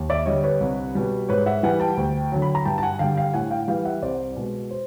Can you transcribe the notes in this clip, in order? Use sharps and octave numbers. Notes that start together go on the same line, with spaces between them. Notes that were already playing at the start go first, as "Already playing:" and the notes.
Already playing: D#2
D5 E5
D3 G3 C#5 D#5
B4 C#5
C2
B2 G3
G#2 B4 C#5
E5 F#5
E3 G3 F#5 G#5
G5 A5
D2
D3 F#3
B5
A#5
G2 G5 A5
A5
F#5 G#5
D3 G3 F5 G5
F5 G5
A2 F#5 G#5
F5 G5
E3 G3 F5 G5
E5 F#5
C2 C5 D5
B2 G#3
C5